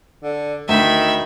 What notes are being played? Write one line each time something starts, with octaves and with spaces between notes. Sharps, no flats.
D3
D2 D#3 E5 B5